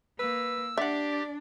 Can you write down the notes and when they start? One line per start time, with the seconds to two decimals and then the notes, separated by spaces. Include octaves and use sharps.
0.19 A#3 B4 E6
0.78 D4 G4 D5 E5 F#5